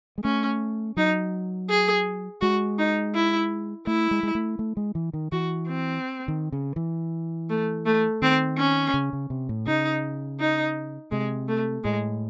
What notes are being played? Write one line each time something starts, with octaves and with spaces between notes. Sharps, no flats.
G#3
A3 C#4
F#3 D#4
G#4
G#3 F#4
D#4
E4
A3 E4
G#3
G#3
A3
A3
G#3
E3
D#3
E3 F#4
C4
D#3
C#3
E3
A3
A3
D#3 C4
C#4
C#3
C#3
C3
A2
C#3 D#4
D#4
C3 G#3
A3
A2 G#3